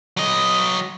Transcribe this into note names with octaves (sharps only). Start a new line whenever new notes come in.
F#3 D#5